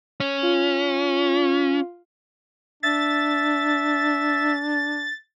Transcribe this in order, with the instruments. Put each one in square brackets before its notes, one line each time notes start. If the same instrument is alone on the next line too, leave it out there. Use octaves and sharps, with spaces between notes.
[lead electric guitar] C#4
[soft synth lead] F4
[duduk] D4 [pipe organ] E5 [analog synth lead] A6